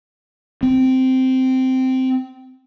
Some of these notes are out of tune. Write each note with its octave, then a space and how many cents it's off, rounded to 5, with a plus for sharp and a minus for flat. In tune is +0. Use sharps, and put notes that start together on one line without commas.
C4 -10